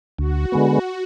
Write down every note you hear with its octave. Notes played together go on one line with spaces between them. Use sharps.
D2 F#4
D3 G#3 B3